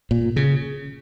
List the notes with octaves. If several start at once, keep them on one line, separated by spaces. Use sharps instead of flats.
A#2
C#3